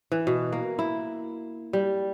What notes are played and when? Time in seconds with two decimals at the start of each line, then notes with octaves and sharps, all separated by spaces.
0.12 E3
0.27 B2
0.53 A#3
0.79 E4
1.73 G3